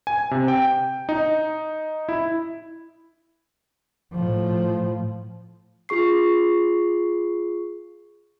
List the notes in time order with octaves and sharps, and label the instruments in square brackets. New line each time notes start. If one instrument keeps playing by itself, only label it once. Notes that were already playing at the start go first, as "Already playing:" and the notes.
[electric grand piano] G#5
C3
G5
D#4
E4
[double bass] A2 F3
[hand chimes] F4 G#4 C#6 C7